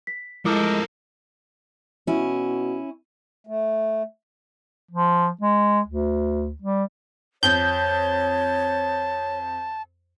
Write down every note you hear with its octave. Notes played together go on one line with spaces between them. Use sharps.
B6
F3 G#3 A3 E4 A4 A#4 D6
B2 C#4 E4
A3
F3
G#3
D2
G3
F2 C#5 A5 G6